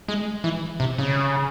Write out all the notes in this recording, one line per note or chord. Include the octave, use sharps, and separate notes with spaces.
G#3
E3
C3
C#3